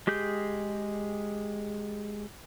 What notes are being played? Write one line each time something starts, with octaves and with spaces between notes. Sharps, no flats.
G#3 G4 G#4 G6